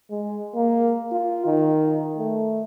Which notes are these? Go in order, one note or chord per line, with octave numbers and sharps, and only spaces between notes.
G#3
A#3
F4
D#3
A3